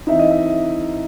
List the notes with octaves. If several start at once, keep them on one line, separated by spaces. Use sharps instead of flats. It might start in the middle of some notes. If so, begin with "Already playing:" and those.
E3 C4 D#4 E5
D#5
E5